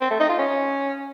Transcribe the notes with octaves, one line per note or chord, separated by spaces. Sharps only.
C4
A3
D#4
F4
C#4